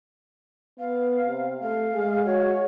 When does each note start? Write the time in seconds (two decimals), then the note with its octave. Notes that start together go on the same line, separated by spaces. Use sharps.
0.79 B3 F5
1.26 C3
1.62 A3 F5
1.94 G#3 G#4
2.26 F#4 C#5